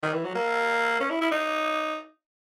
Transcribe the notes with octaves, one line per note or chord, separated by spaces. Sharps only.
D#3
E3
F#3
A#3
C#4
E4
E4
D#4